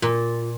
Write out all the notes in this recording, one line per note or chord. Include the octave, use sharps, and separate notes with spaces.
A#2